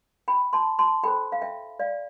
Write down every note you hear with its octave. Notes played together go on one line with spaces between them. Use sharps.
G5 B5
A5 C6
A5 C6
E4 A4 C5 G5 B5
F5
E5 G5
D5 F5